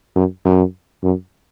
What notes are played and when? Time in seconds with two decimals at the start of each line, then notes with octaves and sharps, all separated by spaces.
0.16 F#2
0.45 F#2
1.04 F#2